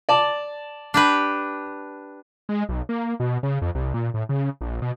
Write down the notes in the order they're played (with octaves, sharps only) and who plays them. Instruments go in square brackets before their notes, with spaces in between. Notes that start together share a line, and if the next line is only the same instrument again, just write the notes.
[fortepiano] D5 A5
[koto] D4 G4 B4
[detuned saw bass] G#3
B1
A#3
B2
C#3
F2
C2
A#2
A2
C#3
A#1
B2